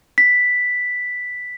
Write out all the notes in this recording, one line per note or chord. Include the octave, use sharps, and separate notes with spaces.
B6